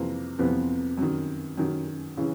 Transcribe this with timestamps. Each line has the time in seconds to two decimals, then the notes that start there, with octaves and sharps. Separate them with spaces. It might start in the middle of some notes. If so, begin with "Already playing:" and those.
Already playing: F2 C3 E3 A#3
0.39 F2 C3 E3 B3
0.98 F#2 D#3
1.57 F#2 D#3
2.17 C#3 E3